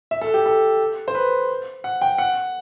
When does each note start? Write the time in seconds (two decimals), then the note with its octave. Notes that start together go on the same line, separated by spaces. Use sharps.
0.11 E5
0.22 A4
0.34 G4
0.46 A4
1.08 C5
1.15 B4
1.84 F#5
2.01 G5
2.18 F#5